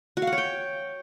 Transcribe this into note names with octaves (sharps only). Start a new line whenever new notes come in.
F#4
F5
F#5
C#5
G5